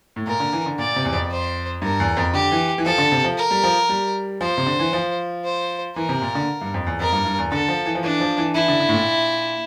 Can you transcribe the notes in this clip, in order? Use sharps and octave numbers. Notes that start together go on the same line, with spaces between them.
A2
A#2 A#4
D3
E3
D3
A#2 D5
C3
E2
F2
C5
G2 A#4
E2
F2
D3 G4
E3
E3
F3 A4
D3
C3
F3
A#4
G3
F3
G3
F3 C5
C3
D3
E3
F3
C5
E3 A#4
C3
A#2
D3
G2
F2
E2
F2 A#4
G2
G2
E2
D3 A4
F3
E3
F3
E3 D4
F3
E3
E3 E4
D3
D3
A2
A#2